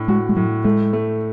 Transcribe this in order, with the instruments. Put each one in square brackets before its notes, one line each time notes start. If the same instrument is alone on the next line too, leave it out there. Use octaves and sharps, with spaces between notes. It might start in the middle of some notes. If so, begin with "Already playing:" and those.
Already playing: [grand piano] A2 D4
[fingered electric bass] G#3 [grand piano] F#4
[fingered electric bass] G#3
[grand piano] A2 [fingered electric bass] F#3
[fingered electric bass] G#3 [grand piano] A3
[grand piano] A3